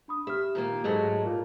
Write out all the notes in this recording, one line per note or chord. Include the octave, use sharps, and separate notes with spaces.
D4 B5 D#6
G4 E5 F6
A#2 D#3 A#3
G#2 F#3 G#3 A3
A#2